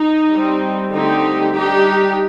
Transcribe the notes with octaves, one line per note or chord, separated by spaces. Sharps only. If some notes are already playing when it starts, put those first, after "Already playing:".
Already playing: D#4
G3 C4
D3 A3 C4 D#4 G4
G3 D4 D#4 G4